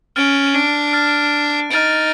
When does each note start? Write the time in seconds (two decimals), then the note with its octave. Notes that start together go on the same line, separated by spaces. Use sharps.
0.16 C#4 F6 A6 D7
0.55 D4
0.93 F6 A6 D7
1.71 D#4 F6 A6 D7